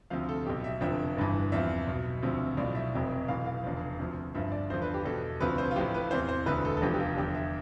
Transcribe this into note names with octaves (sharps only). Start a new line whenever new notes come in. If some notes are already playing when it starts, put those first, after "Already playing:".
D2 C3 F3 F5
A4
B1 B2 G4
E5
F1 F2 D3 F3 E5
G1 G2 E3
E2 C3 F3 E5
B1 B2
D2 C3 F3
B1 A2 F3 D5
E5
F1 F2 C3
B1 A2 E3 F5
F5
F1 E2 D3 F3
D2 C3 F3
G1 G2 F3 E5
D5
E2 D3 F3 C5
B4
G4
E2 B2 A4
D2 C3 F3 B4
C5
F4
A1 A2 F3 G4
B4
E2 C3 E3 C5
C5
E1 D2 D3 B4
A4
A4
F1 E2 D3 F3 G4
G4
F4
E2 D3 F3 G4
E5